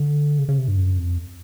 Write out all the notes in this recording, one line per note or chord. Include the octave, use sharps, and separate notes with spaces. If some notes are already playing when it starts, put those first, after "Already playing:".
Already playing: D3
C#3
C#3
C3
G2
F#2
F2